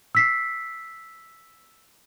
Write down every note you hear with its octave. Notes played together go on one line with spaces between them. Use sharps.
E6 B6 C7